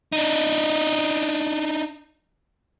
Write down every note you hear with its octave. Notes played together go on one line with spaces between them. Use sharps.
D4 D#4